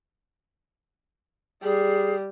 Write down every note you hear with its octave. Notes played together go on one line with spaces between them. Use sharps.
G3 G#4